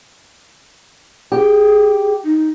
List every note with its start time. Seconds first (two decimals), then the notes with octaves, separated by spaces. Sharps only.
1.32 G4 G#4
2.24 D#4